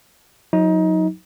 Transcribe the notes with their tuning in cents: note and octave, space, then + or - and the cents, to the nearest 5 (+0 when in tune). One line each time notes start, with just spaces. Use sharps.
F#3 -30 D#4 +25